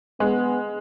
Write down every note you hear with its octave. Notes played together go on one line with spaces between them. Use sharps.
G#3 B3